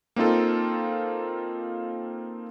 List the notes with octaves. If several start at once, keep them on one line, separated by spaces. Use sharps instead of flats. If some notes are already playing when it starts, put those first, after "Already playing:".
A#3 C4 D#4 F4 A4